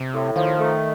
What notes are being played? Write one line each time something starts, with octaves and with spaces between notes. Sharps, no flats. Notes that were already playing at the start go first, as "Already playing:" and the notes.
Already playing: C3
A2
D#3 F3
A3